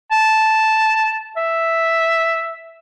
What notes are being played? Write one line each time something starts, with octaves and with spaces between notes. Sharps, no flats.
A5
E5